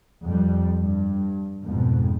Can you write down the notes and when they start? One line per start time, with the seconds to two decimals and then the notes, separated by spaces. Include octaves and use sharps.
0.24 F2 G3
0.79 G2
1.64 F2 G#2 B2